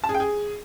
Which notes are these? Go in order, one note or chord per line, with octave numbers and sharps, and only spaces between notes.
A5
G#4
G5
G#4